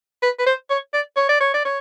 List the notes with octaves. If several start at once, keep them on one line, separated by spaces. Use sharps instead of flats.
B4
B4
C5
C#5
D5
C#5
D5
C#5
D5
C#5